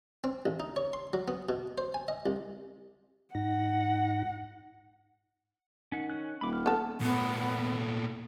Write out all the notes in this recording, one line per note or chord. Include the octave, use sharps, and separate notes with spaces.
C4
A1
D#4
C#5
C6
F#3
B3
B2
C5
G#5
D#5
C2
G#2 D#4 F#5 A#6
D#3 C#4 F#5
C#4 F#6
D#1 B5 D6
F6
B3 A4
A#2 A3 B3